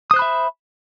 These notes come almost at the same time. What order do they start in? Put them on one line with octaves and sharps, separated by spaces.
D#6 C5 F#6 B5 E5